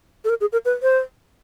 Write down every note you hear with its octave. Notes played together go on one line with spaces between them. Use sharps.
A4
A#4
G#4
A#4
B4
C5